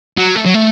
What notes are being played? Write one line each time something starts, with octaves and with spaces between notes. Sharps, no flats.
F#3
A3
F#3
A3